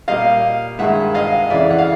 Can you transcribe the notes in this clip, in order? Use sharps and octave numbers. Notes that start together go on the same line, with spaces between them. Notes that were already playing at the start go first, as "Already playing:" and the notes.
A#2 G3 A#3 D#5 F5
G2 D#3 G#3 E5 F#5
D#5 F5
F2 C#3 E3 D5 E5
F#5
F5